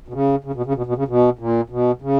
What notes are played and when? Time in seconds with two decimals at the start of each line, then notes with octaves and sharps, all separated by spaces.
0.08 B2
0.14 C#3
0.44 C#3
0.55 B2
0.66 C#3
0.75 B2
0.86 B2
0.96 C#3
1.08 B2
1.39 A#2
1.70 B2
2.02 C#3